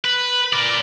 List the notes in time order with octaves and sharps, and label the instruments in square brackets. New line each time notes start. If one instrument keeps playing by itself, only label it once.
[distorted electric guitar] B4
A#4 D5